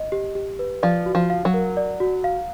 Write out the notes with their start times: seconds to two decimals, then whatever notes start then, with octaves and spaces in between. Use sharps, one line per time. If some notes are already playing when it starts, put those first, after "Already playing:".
Already playing: D#5
0.12 G4
0.35 G4
0.59 B4
0.83 F3 D5
1.06 F#4
1.15 F3
1.30 F5
1.45 F#3
1.54 A#4
1.77 D5
2.00 F#4
2.24 F5